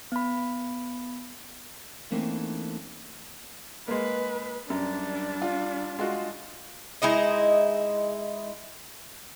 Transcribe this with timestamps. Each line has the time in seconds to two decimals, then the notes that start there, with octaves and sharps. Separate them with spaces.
0.12 B3 B5
2.11 E3 A3 A#3 C4 C#4 D#4
3.88 G#3 A#3 B4
4.70 F#2 G3 D4
5.42 F4
5.99 G#3 F4 F#4
7.02 G#3 D#4 E4 D#5